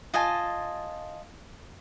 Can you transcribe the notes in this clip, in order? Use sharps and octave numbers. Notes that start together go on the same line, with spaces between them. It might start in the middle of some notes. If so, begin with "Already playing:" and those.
F4 D#5 G#5 A5